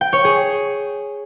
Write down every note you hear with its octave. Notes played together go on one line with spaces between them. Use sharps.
G5
C#5
G#4